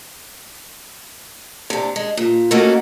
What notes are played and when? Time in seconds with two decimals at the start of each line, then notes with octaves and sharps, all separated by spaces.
1.70 C3 D4
1.96 G#3
2.17 A#2
2.51 A3 A#3 C#4 D#4 F#4 A4